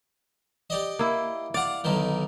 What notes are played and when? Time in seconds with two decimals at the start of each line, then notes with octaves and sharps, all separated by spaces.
0.70 G4 D5 D#5
0.99 A#3 E4
1.54 D5 F5 F#5
1.84 B1 D3 D#3